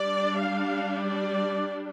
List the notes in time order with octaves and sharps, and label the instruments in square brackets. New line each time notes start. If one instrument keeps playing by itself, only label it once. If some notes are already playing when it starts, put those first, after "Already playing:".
Already playing: [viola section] G3 D4 D5
F5
D5